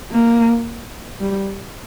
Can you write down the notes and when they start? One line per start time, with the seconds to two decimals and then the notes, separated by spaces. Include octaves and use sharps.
0.12 A#3
1.21 G3